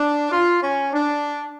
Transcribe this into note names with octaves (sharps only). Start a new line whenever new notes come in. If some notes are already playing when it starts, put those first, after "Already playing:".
Already playing: D4
F4
C#4
D4